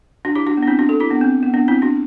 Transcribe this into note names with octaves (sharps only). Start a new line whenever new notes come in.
D4 F#4
E4 G4
D4 F#4
B3
D4
C4 E4
D4 F#4
F#4 A4
E4 G4
B3 D4
C4
B3
B3 D4
C4 E4
D4 F#4